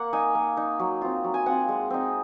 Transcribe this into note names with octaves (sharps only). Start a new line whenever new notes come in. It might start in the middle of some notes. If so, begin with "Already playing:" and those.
Already playing: A#3 F#5
D#4 G#5
A#3
D#4
F#3
C4 F4
F#3
G#5
C4 F4 F#5
G#3
C4 D#4